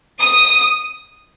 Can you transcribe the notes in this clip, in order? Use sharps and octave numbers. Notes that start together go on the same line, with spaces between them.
D#6